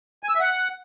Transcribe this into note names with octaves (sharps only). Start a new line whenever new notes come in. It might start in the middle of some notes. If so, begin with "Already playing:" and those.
G#5
E6
E5
F#5